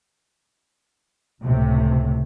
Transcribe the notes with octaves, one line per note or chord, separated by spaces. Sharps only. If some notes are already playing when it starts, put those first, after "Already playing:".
C#2 A2 C3